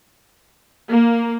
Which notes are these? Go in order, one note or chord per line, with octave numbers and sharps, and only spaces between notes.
A#3